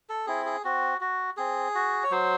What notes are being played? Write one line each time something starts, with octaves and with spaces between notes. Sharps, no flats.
A4
C4 E4 G#4
G#4
C4 F#4
F#4
C4 G#4
F#4
C#5
F#3 C5